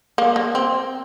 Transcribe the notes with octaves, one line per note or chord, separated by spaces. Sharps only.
A#3
A#3
C4